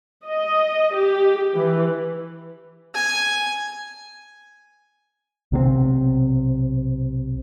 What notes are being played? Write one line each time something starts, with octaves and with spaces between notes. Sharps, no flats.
D#5
G4
E3
G#5
B1 C3 F#3 C4